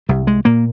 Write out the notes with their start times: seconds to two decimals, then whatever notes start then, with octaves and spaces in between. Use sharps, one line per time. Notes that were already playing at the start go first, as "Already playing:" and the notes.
0.09 C2 G3
0.27 G#3
0.45 A#2 A#3